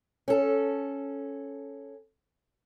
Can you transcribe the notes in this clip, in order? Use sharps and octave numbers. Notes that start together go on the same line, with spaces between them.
C#4 A4